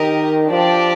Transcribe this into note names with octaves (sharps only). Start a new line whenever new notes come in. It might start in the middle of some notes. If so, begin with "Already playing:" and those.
Already playing: D#3 G4 A#4 D#5
F3 D4 G4 D5